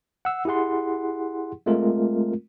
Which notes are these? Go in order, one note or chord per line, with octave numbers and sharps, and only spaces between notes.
F#5 E6
E4 G4 G#4 F#5 C6
G#3 A3 C4 F4 A#4